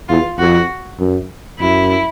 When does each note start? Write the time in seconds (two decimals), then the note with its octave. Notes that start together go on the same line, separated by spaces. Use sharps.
0.09 E2 F4
0.39 F2 F#4
0.99 F#2
1.59 F#2 E4